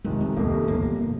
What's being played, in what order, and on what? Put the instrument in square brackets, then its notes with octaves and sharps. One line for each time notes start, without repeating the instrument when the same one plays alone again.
[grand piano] F1 F2 C3 D#3 [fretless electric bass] G#3
[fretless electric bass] G#3
[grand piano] F1 F2 C3 D#3 [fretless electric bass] A#3
[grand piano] G1 F2 C3 [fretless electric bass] A#3
[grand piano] C3